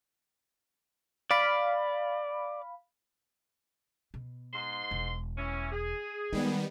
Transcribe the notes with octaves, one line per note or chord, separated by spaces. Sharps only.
D5 F5 B5
B2
G#2 C6
E1
E3 C#4
G#4
D#3 G3 G#3 B3